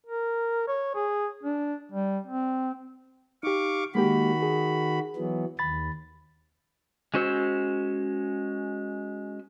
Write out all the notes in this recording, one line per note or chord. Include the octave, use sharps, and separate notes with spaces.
A#4
C#5
G#4
D4
G3
C4
D#4 G4 F5 C#6 D6
D#3 G#3 A#3 F#4 G4 B5
G#4
E3 F#3 B3
D#2 B5 A6
G#3 C#4 F#4 C5 E6